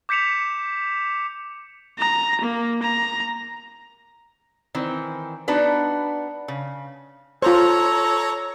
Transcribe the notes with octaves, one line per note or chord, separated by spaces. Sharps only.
D6 G6 B6 C#7 E7 F7
A#5
A#3
A#5
D#3 E3 C4
B3 D4 D#4 F#4 B4
C#3
F4 A4 C5 C#5 A#5